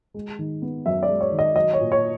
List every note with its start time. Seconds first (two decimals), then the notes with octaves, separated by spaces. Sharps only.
0.14 G#3
0.39 D#3
0.62 B3
0.86 F#2 E5
1.03 D5
1.09 G#3
1.21 C#5
1.32 D#3
1.39 D#5
1.56 F#3 D#5
1.74 C#5
1.80 A#2
1.92 C#5